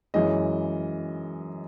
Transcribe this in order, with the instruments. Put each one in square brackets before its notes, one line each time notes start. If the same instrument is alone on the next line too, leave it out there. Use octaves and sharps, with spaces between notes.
[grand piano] F#2 E3 G#3 D#5